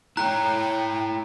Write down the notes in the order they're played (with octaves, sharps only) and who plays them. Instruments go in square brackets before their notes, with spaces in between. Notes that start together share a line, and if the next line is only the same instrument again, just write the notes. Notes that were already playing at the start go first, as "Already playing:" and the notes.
[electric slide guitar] E4 A4 C#5 [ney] G5 [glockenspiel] A#5 F#6